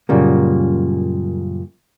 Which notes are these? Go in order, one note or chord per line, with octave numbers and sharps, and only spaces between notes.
F#2 A#2 C#3 G3 A#3